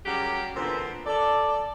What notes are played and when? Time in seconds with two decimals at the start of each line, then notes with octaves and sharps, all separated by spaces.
0.05 C#3 F#3 G3 G4 A#4 F#5
0.56 A#2 D3 E3 B3 C4
1.06 A4 D5